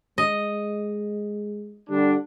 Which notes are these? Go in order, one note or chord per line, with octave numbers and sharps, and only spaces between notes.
G#3 D#5
D3 G3 D4